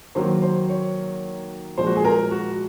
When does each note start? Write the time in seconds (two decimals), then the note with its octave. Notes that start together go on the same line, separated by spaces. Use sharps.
0.15 D#3 F#3 A#3 C5
0.42 C5
0.69 C#5
1.78 A#2 F3 G#3 C5
1.87 F#4
1.96 G#4
2.05 A#4
2.31 F#4